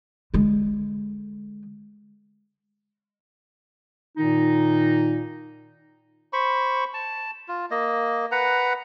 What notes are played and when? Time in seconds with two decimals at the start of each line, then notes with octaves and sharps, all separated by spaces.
0.34 D3 G#3
4.18 A#2 D#3 D#4
6.33 C5 B5 C#6
6.94 A5
7.48 F4
7.71 A#3 D#5
8.32 B4 F#5 A#5